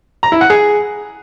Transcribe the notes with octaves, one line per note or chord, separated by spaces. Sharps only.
A#5
E4
F#5
G#4